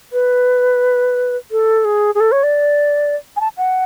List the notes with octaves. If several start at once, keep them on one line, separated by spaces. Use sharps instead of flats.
B4
A4
G#4
G#4
A4
C#5
D5
G#5
A5
F#5